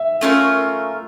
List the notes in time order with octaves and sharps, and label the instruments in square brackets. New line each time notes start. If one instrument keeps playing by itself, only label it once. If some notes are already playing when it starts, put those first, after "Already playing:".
Already playing: [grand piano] E5
[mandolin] A3 C#4 F4 A#4